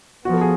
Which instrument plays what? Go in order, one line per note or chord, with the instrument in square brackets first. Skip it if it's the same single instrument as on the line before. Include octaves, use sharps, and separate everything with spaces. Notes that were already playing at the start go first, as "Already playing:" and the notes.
[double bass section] F3 B3 [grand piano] F#4
[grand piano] A4
G#4